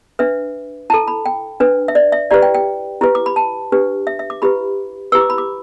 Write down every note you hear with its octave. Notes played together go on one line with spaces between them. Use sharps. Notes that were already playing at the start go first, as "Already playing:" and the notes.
D4 B4 E5
E4 A4 A5
B5
G5
D4 B4
E5
D5
E5
E4 G4 B4 D5
G5
G5
E4 G4 B4
D6
B5
A5
D4 G4 B4
E5
E5
D6
E4 G4 B4 B5
E4 G4 B4 E6
D6
B5
D6